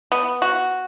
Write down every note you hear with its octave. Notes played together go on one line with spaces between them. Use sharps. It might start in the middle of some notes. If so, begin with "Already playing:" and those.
B3
F#4